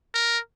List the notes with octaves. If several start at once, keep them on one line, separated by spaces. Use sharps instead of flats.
A#4